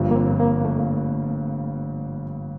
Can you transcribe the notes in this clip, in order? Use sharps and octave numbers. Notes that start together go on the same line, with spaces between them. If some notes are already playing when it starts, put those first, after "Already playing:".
Already playing: G1 G2 F3 A#3
A#3
C4
A#3
A3